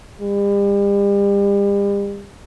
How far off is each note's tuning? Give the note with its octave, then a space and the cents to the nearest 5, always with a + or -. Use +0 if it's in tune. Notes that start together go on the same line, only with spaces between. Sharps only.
G3 +40